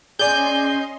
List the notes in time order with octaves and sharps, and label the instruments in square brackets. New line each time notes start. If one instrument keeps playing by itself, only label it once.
[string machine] C#4 D#5 C6 [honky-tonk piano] G#4 D5 [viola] G#5 [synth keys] G6